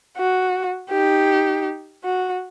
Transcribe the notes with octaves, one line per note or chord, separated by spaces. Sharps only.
F#4
D#4 G4
F#4